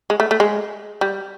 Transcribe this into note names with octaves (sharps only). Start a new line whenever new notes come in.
G#3
A3
A3
G#3
G3